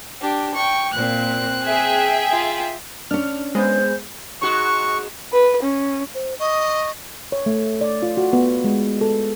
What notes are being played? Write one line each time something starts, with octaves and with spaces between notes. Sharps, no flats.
D4 G4
G5 C#6
A#2 C4 F#6
G#4 E5 G5
F4
C#4 D4 F6
G#3 B3 C5
G#2 F#4 C#6
B4
C#4
C5
D#5 C#6
C#5
A3
D5
F4
F#4
B3
G#3
A4